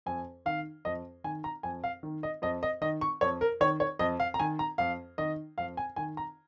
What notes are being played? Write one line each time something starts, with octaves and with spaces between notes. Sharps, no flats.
F2 G#5
D#3 F5
F2 D#5
D#3 G#5
A#5
F2 G#5
F5
D#3
D#5
F2 D#5
D#5
D#3 D#5
C#6
F2 C#5
A#4
D#3 C#5
C#5
F2 D#5
F5
A#5
D#3 G#5
A#5
F2 F5
D#3 D#5
F2 F5
G#5
D#3 G#5
A#5